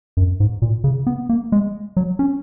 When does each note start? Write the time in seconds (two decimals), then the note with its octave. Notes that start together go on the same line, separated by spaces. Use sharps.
0.17 F#2
0.40 G#2
0.62 A#2
0.84 C#3
1.07 B3
1.29 A#3
1.52 G#3
1.97 F#3
2.19 C#4